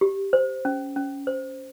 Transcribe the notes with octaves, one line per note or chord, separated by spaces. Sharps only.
G4
C5
C#4
C#4
C5